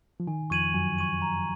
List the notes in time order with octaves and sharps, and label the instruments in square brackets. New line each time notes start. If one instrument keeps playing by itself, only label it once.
[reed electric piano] F3
[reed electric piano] D#3 [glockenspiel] G#5
[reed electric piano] F2 F3 [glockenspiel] C#6 G#6 D#7 F#7
[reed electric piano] F#2 F#3 [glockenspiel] G#5
[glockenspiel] C#6 G#6 D#7 F#7
A#5